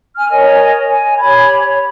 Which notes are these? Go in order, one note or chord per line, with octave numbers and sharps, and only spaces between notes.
G#5 F6
A#4 C#5 D#5 G#5
G#5
G4 C#5 B5 G#6
C#5